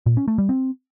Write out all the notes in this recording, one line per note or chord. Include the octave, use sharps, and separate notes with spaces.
A#2
C#4
A3
G3
C4